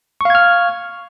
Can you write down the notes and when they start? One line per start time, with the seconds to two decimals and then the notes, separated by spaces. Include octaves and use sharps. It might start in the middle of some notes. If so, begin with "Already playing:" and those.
0.21 C#6
0.25 F5
0.30 G#6
0.35 F6